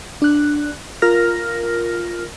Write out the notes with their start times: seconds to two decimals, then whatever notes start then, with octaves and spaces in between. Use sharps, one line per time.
0.22 D4 F#6
1.02 F4 A#4 F6 A#6